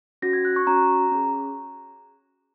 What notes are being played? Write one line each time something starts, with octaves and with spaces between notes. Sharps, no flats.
C#4 F#4 A#6
G#6
F#6
C#6
C#4 F#4 A#5
C#4 G#4